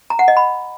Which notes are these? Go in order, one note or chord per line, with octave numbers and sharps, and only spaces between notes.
A#5
F#5
D#5
B5